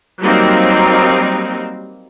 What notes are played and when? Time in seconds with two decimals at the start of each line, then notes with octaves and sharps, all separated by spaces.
0.22 F#3 G3 A#3 C4 D#4